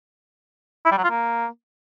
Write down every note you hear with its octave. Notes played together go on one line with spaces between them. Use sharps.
E4
G3
F#3
F4
A#3